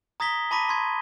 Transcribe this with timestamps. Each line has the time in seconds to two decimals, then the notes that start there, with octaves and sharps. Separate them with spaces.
0.20 A#5 D#6 G#6 A#6 B6 G7
0.51 A5 B5 D6 A#6 B6 D#7
0.69 C6 G#6